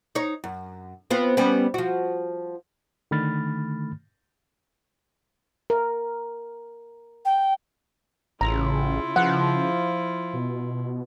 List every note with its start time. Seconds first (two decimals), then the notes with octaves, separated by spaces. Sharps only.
0.15 D#4 C#5
0.44 F#2
1.10 B3 C4 F4
1.37 G3 B3 C#4
1.74 F3 F#4
3.11 D3 D#3 A3 B5 F6 A6
5.70 A#4
7.25 G5
8.41 A1 C#3 E4 F4 A#5
9.16 F3 F#5
10.34 B2